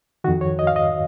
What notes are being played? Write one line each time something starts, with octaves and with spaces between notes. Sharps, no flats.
F2 D#3 F#4
C#5
D#5
F5
D#5